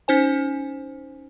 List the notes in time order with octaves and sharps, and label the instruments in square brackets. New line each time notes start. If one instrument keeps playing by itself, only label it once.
[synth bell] C#4 D#4 C5 G#5